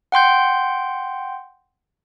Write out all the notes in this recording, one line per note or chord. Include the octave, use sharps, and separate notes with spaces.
F#5 G5 C6 G6